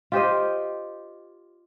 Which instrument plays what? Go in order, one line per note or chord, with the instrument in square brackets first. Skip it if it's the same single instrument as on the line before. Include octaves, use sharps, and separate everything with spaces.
[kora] F4 G4 C5 D#5